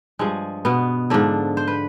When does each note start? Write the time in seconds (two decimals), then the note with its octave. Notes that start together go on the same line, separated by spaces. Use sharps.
0.19 G2 F3 G#3
0.65 B2 B3
1.10 G#2 D3 F3 D4
1.57 C5
1.68 B4